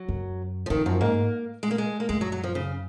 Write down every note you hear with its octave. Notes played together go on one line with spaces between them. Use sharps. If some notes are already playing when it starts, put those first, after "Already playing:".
Already playing: F#3
F#2
F3
F2 D#3
F#2 F3
G#2 A#3
G#3
A#3
G#3
A#3
F#2 G#3
F#3
F#3
F3
C#3